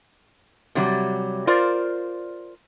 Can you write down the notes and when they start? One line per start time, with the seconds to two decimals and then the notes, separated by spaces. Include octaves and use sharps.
0.75 C3 F#3 G3
1.47 F4 A#4 C5 D5